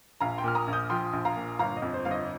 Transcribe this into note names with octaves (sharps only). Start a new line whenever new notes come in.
A#1 F5 A#5
G5 C6
A#2 F6
A#5 D#6
A#1
D#6 G6
F3 G5 C6
A#1
F5 A#5
A#2
G1 F5 A#5
D#5
F2
C5
G1 F5
D#5